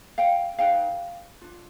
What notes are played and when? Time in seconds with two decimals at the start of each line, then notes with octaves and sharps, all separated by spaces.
0.18 F5 G5
0.59 D#4 G#4 B4 F5 G5
1.42 D4 F4